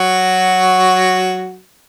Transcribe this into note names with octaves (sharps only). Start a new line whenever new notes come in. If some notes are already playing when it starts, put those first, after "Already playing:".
Already playing: F#3 F#4